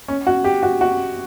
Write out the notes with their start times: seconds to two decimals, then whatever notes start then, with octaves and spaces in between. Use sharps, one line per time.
0.08 C#4
0.27 F#4
0.44 G4
0.63 F#4
0.81 F#4